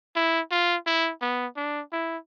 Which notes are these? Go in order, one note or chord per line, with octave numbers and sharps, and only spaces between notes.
E4
F4
E4
B3
D4
E4